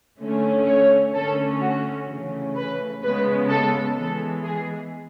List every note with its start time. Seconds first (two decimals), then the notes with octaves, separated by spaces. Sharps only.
0.20 D3 A3 C#4
0.67 C#5
1.14 D3 A3 C#4 A4
1.61 F#4
2.08 C#3 E3 A3 C#4
2.56 B4
3.02 C#3 G#3 B3 B4
3.50 A4
3.96 E3 G#3 B3 A4
4.43 G#4